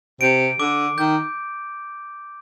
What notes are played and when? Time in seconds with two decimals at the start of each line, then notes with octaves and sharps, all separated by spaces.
0.21 C3 D7
0.60 D3 D6
0.98 D#3 G6